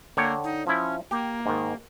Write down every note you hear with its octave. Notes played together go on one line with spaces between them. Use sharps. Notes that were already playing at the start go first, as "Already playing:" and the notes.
D3 A#3 C#5 G5
D#4
F3 C#4 E4
A#3 G4
G#2 D#3